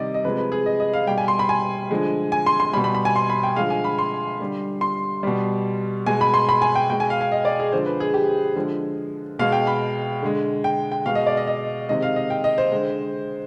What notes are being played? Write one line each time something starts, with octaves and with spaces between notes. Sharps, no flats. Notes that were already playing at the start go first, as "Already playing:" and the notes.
Already playing: C3 D#3 G3 D5 D#5
D#5
C3 F3 G#3 B4
B4
G#4
D#5
D#5
F5
B2 G3 G5
G#5
C6
B5
G#5
D3 F3 G#3
G#5
C6
C6
B2 G3 B5
B5
B5
G#5
C6
B5
G5
D3 F3 G#3 F5
G#5
B5
C6
D3 G3
C6
B2 G3
B2 G#3 G#5
B5
C6
B5
G#5
G5
B2 G#3 G5
G#5
F5
F5
D#5
D5
G#4
D3 F3 G#3 C5
B4
G#4
G4
D3 F3 G#3
B2 G#3 F5
G5
B5
D3 G#3
G5
G5
B2 G#3 F5
D#5
D5
D#5
D#5
C3 D#3 G#3 D#5
F5
D#5
G5
D#5
C5
D3 G#3